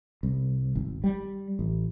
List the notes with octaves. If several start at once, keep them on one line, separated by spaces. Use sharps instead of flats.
C2
G#1
G3
A1